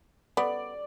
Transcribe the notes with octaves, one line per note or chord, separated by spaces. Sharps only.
B3 D5